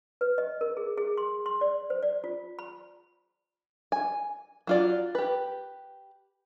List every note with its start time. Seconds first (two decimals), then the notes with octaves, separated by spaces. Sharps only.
0.21 B4
0.38 D#5
0.61 A#4
0.77 G#4
0.97 G#4
1.17 C6
1.46 C6
1.61 D5
1.90 C5
2.03 D5
2.24 F4
2.59 B5
3.92 G#5
4.67 F#3 F4 D5
5.15 G4 B4